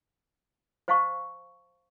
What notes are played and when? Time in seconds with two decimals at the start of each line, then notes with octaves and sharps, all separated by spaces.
0.88 C5 D#5 F5 A5 C#6